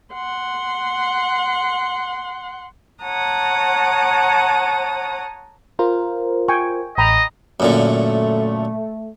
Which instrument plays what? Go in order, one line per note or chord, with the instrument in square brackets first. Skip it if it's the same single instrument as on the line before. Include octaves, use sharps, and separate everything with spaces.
[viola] F#5 C6
[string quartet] C#5 F#5 A5 A#5 D#6
[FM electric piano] F4 A#4 C5
[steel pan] G5 G#5 C#6
[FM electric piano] A1 [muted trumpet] D#5 [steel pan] G5 A#5 B5
[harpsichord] F#2 A#2 D3 [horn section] A3